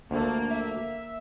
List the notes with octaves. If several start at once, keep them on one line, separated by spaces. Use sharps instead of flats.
D2 F3 A3 A#3
E5